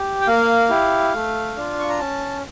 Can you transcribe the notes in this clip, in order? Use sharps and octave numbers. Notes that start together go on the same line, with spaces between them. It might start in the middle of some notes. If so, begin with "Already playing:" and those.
Already playing: G4
G5
A#3 F5
E4 G4
A3
D4 F4
C#6
A#5
C#4 A5